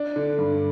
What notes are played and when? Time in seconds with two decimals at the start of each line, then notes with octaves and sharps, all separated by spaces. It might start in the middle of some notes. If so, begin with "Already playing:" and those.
Already playing: D4
0.16 D3
0.38 G2